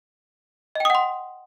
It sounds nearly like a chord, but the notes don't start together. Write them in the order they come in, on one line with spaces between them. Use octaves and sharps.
D#5 G5 D#6 F#5 C6